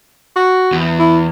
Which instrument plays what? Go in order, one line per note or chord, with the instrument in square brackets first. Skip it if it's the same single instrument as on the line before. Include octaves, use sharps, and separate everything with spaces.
[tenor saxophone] F#4
[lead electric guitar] E2
[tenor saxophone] E4